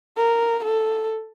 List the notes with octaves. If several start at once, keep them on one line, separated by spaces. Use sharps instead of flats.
A#4
A4